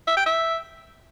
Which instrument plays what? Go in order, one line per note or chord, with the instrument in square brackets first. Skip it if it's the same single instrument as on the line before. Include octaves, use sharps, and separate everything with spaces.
[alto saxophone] E5
G5
E5